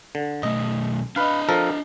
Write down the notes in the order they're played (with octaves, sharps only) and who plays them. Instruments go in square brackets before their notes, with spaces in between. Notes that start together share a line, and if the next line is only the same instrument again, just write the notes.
[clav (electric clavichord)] D3
[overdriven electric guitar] B1 A3 [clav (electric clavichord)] D#5
[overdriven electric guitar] D4 D#5 [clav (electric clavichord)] B4 F5
[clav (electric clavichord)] F3 A4 A#4